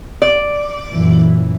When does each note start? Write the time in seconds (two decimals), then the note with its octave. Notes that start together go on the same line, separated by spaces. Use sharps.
0.22 D5
0.91 F#2 A#2 E3